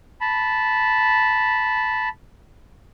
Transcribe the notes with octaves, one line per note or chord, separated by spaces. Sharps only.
A5 B5